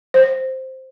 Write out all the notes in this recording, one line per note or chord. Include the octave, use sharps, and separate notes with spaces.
C5